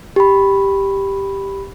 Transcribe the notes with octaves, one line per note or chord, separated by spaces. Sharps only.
G4 B5